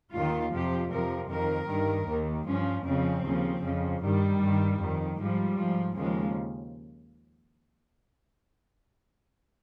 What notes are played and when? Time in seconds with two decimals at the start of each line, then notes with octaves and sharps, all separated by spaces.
0.13 D#2 D#3 F4
0.52 F2 C3 F3 G4
0.91 F2 C3 F3 A#4
1.30 F2 D#3 A#4
1.68 G2 D#3
2.08 D#2 D#3
2.47 G2 F3 C#4
2.85 F2 C#3 F3 C4
3.24 D#2 C#3 F3
3.63 F2 C#3 F3
4.02 G2 D#3 G3
4.41 G2 D#3
4.80 F2 D#3
5.18 G#2 F3 G3
5.57 G#2 F3
5.96 D#2 C#3 F3 G#3